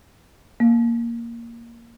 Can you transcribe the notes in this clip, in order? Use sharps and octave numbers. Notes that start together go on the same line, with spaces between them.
A#3